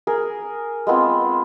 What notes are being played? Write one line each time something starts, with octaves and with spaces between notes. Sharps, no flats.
G#4 A#4
G#3 B3 C4 F4